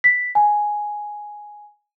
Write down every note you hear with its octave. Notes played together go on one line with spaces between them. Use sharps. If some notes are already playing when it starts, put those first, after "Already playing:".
B6
G#5